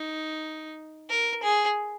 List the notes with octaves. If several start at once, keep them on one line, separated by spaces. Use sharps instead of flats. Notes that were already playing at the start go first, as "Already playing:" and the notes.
Already playing: D#4
A#4
G#4